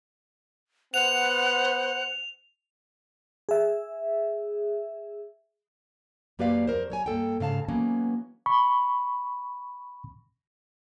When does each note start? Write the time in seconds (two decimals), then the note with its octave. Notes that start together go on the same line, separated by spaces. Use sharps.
0.94 B3 C5 F#5 F7
3.49 G#4 E5
6.39 F#2 A#3 G4 B4 D5 F5
6.67 F2 A#4 C5
6.90 F#3 C#5 G#5
7.06 G2 A#3 A4 G5
7.40 G#2 C#3 F5 A5
7.69 E3 F#3 A#3 B3 C#4
8.46 B5 C#6